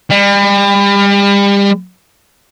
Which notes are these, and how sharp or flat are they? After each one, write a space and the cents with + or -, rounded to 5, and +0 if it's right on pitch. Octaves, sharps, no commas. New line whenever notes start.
G3 +35